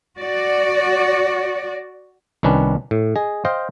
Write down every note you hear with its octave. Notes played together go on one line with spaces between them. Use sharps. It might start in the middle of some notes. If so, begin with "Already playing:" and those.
F#4 D5
C2 D#3 C#4 D4 B4
A2
G#4 D#5
C5 D#5 F5 G5